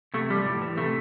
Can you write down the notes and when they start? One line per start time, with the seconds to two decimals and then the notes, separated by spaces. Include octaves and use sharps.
0.14 C3 A3
0.30 F3 G3
0.46 A2
0.62 E3
0.77 C3 A3